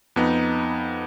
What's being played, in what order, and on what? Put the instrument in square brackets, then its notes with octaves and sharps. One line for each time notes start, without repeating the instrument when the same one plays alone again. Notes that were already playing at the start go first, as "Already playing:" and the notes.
[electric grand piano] F2 B3 D#4